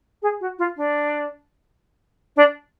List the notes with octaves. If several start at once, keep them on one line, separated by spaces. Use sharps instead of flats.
G#4
F#4
F4
D4
D4